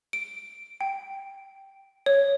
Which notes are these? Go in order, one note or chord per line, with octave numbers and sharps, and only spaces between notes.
D7
G5
C#5